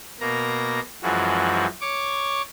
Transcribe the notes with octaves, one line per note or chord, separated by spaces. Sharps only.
B2 A#3 A#5
F#2 E3 F3 G#3 F#4
C#5 C#6 D6